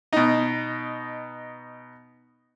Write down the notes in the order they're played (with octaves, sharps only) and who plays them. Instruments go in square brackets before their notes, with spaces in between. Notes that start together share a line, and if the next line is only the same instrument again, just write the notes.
[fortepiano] B2 D#4